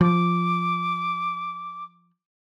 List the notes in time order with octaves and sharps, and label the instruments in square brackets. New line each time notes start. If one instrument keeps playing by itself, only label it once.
[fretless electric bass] F3 [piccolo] D6